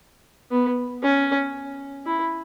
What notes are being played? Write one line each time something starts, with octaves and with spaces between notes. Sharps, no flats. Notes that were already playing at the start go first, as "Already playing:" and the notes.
B3
C#4
E4